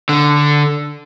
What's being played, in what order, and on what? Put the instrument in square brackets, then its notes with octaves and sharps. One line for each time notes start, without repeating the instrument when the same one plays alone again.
[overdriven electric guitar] D3